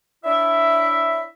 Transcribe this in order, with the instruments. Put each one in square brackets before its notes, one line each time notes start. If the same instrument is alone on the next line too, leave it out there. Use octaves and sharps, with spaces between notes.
[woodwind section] D4 E4 C#5 E5